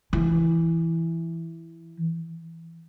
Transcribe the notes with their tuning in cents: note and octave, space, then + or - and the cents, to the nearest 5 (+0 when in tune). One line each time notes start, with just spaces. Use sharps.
E3 +5